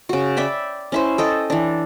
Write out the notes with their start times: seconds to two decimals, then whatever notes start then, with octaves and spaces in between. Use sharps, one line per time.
0.09 C#3 F#4
0.37 D5 E5 G5 B5
0.92 C#4 E4 C5
1.18 A4 D#5 G5
1.50 E3 D4